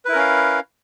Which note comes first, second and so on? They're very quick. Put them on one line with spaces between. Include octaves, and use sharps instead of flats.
B4 E4 A#4 C#4 F5